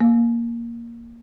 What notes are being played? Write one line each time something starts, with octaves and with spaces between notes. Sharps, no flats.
A#3